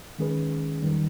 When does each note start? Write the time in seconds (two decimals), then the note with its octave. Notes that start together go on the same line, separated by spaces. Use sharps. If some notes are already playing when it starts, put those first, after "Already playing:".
0.19 D#3 G#3 C#4 G#4 B4
0.82 E2 D#3 G3